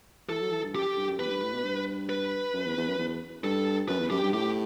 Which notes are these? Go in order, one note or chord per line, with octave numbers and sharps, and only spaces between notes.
E3 A4
F#3
E3
G2
F#2 G4
G2
F#2
E2 B4
A2
G2
A2
B2
G2
B4
F#2
E2
E2
F#2
E2
G2 A4
F#2 B4
E2
F#2 G4
G2
A2 G4